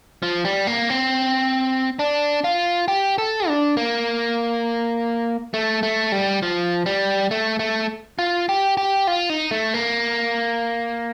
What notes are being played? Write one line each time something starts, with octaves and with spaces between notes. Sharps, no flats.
F3
G3
A#3
C4
D4
F4
G4
A4
D4
A#3
A3
A3
G3
F3
G3
A3
A3
F4
G4
G4
F4
D#4
A3
A#3